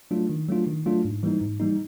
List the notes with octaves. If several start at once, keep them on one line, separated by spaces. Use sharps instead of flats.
F#3 A3 D4 F4
D#3
F#3 A3 D4 F4
D#3
F#3 A3 D4 F4
G#2
E3 G3 A#3 D#4
G#2
E3 G3 A#3 D#4